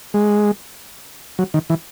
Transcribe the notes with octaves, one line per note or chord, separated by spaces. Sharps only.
G#3
F#3
D#3
E3